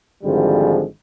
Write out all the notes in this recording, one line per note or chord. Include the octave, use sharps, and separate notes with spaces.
G#1 D3 F3 G3 G#3